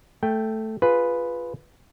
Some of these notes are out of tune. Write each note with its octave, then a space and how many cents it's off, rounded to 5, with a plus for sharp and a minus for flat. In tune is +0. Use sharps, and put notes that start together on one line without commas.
A3 +0 G5 +0
F4 +0 G#4 +0 B4 +0